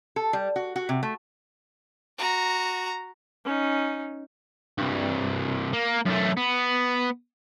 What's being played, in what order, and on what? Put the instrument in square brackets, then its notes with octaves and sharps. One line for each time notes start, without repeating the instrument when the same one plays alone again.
[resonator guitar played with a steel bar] A4
G3
F#4
F#4
C3
A3
[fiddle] F#4 A#5
[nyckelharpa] C#4 D#4
[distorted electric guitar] C2 G2
A#3
F#2 A3
B3